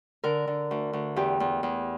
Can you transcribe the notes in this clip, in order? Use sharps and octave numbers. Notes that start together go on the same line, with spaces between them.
D3 A#4
D3
D2
D2
E2 G4
E2
E2